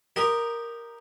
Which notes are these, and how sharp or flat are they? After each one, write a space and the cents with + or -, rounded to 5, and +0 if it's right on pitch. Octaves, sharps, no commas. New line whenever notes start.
G4 +0 A#4 +0 D#5 -15